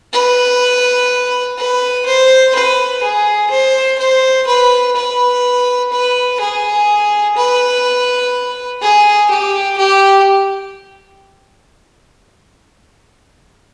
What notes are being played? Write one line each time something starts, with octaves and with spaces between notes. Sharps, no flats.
B4
B4
C5
B4
G#4
C5
C5
B4
B4
B4
G#4
B4
G#4
G4
G4